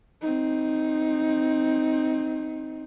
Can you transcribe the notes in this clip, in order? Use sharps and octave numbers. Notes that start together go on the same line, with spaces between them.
C4 D#4